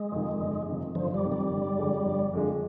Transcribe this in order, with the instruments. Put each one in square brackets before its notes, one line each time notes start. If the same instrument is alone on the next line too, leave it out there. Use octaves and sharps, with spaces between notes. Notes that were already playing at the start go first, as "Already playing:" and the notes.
Already playing: [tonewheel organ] G#3
[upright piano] F2 C3 D#3
G1
F2 C3 D#3
[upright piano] G1 [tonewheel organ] F3
[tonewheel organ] G3
[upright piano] F2 C3 D#3
[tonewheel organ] G3
[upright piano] G1
F2 D3 G#3
G1
F2 D3 G#3